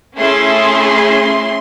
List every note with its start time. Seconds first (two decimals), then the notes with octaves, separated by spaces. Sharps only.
0.18 A3 C#4 E4 G#4 C6